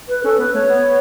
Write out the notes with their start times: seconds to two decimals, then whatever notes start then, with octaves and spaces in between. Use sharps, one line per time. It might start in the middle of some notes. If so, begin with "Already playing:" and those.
0.09 B4
0.24 C#4 A4
0.39 B3 B4
0.54 A3 C#5
0.69 B3